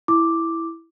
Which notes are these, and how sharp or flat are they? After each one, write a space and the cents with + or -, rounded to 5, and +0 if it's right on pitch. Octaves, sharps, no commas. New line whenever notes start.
E4 +0 D6 +0